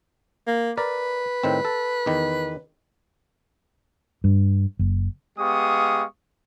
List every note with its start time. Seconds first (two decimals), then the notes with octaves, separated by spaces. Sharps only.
0.47 A#3
0.77 A#4 B4 D5
1.43 A2 D#3 C4
1.65 A4
2.06 E2 D#3
4.24 G2
4.79 F#1
5.39 G#3 B3 G4 F5 C#6 D#6